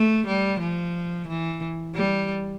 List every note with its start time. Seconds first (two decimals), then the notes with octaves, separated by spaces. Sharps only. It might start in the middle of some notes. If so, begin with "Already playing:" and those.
Already playing: A3
0.26 G3
0.60 F3
1.28 E3
1.95 G3